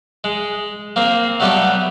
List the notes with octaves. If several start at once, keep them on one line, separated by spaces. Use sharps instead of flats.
G#3
A#3 C4
F#3 G3 A3 B3 G4